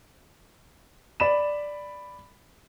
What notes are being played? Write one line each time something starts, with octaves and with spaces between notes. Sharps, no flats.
D5 B5 E7